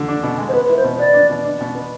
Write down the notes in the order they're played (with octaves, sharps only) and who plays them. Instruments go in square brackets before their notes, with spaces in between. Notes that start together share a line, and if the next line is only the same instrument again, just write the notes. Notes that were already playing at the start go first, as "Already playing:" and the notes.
Already playing: [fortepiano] D3
D4
B2
G#3
[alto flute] C5
[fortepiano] B3 [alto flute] B4
[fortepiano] E4 [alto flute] B4
[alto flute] C5
[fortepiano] B2
[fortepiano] B3 [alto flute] D5
[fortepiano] D4
B2
D4
B2
B3